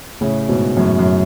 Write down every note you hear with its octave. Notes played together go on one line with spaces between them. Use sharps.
A2 C#3
G#2 B2
F#2 A2
F#2